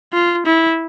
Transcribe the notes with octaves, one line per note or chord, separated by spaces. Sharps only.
F4
E4